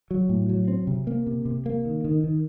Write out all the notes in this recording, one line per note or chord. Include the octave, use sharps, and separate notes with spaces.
F#3
A2
F#3
C4
C3
A#3
C3
C3
A#3
D#3
D#3
D#3